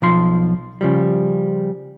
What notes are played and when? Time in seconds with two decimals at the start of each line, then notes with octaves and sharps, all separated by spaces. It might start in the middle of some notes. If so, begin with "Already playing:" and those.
0.02 B1 F3 C6
0.81 C#3 F3 G3